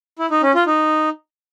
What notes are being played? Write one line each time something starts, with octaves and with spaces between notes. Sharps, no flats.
E4
D#4
C#4
F4
D#4